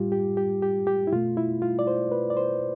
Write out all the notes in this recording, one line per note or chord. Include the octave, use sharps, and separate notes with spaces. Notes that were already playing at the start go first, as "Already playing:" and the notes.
Already playing: A2 G3 F4 G4
G4
G4
G4
G4
E4
B2 A3 F4
E4
F4
D5
C5
B4
D5
C5